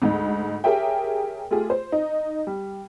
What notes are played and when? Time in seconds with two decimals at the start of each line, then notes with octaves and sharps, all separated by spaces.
0.02 D2 G#2 D#4
0.64 G4 G#4 A#4 C#5 E5 G5
1.51 A3 F4 G4 G#4
1.70 C5
1.92 D#4
2.47 G3